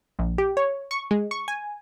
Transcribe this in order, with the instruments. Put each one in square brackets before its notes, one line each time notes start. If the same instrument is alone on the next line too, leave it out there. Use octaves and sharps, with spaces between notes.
[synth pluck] A#1
G4
C#5
C#6
G#3
C#6
G#5